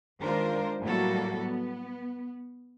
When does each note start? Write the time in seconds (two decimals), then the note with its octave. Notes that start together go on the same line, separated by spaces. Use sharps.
0.21 D#3 G#3 D4 F4 A#4 C5
0.83 A2 F#3 G3 A#3 F#4 A4
1.38 B3